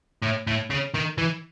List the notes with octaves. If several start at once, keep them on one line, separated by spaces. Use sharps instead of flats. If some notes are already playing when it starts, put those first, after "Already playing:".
A2
A2
C#3
D#3
E3